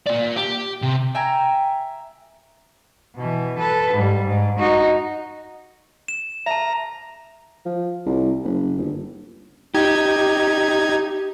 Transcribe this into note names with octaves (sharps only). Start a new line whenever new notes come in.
A#2 D5
G4
C3
E5 G5 G#5 A#5
B2 E3
A4 B4
G#2 G3
G#2
D#4 F#4
E7
E5 A5 A#5
F3
C2
F#1
G1
D#4 G4 G#6